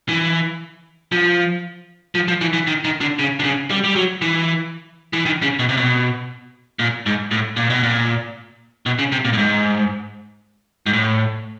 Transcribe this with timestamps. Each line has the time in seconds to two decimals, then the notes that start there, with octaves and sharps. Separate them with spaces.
0.09 E3
1.12 F3
2.15 F3
2.28 F3
2.41 E3
2.53 E3
2.67 D#3
2.85 D#3
3.01 D3
3.19 C#3
3.40 D3
3.44 C#3
3.71 G3
3.84 G3
3.96 F#3
4.22 E3
5.13 E3
5.26 D#3
5.42 C#3
5.59 B2
5.69 C3
5.77 B2
6.79 A#2
7.06 G#2
7.31 A2
7.57 A#2
7.70 B2
7.83 A#2
8.86 B2
8.99 C#3
9.12 C3
9.25 A#2
9.33 A2
9.38 G#2
10.86 G#2
10.93 A2